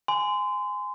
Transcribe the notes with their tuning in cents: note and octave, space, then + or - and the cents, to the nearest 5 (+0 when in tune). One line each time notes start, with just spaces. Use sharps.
G#5 +0 C6 -30